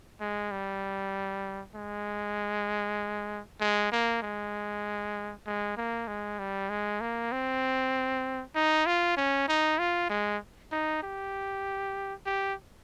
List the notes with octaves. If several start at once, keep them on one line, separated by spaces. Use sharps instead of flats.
G#3
G3
G#3
G#3
A#3
G#3
G#3
A#3
G#3
G3
G#3
A#3
C4
D#4
F4
C#4
D#4
F4
G#3
D#4
G4
G4